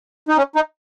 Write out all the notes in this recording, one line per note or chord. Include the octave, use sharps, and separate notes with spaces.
D#4
C#4
D#4